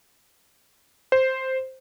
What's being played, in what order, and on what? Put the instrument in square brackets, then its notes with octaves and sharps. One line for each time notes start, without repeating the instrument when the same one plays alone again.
[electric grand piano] C5